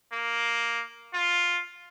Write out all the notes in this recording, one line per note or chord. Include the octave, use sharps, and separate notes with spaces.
A#3
F4